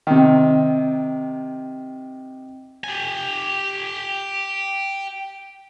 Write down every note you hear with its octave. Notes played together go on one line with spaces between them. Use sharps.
C3 D#3
G4 G#5